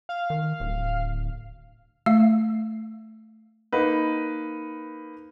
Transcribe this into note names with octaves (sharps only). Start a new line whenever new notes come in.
F5
D#3
D1
A3 F5
A#3 D#4 B4